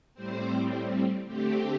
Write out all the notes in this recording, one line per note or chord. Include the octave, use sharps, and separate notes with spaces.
A2 G3 C4 C5
D3 A3 C4 G4